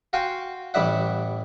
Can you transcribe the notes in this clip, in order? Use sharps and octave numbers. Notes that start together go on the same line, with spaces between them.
F#4 F5 G5 G#5 C6 C#6
A1 E3 G3 D5 E5 F#5